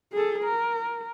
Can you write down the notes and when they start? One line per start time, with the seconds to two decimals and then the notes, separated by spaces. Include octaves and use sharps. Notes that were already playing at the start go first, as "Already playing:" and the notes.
0.12 G#4 A4
0.44 A#4